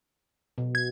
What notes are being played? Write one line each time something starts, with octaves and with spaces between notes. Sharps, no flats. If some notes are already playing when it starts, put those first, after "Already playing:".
B2
G#6